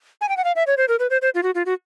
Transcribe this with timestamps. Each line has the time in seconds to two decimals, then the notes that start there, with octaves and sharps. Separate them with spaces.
0.21 G#5
0.29 G5
0.37 F#5
0.44 F5
0.56 E5
0.67 C#5
0.77 C5
0.88 A#4
0.99 B4
1.10 C5
1.22 C5
1.35 F4
1.43 F#4
1.55 F4
1.66 F#4